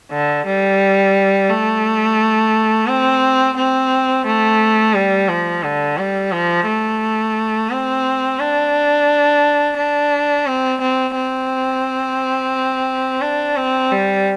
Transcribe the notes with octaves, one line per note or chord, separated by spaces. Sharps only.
D3
G3
A3
C4
C4
A3
G3
F3
D3
G3
F3
A3
C4
D4
D4
C4
C4
C4
D4
C4
G3